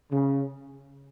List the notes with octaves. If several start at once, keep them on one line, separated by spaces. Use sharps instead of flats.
C#3